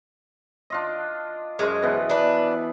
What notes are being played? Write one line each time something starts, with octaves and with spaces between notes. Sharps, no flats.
D4 F4 D#5
F#2 G#3 C5
B2 E3 B3
D4 B4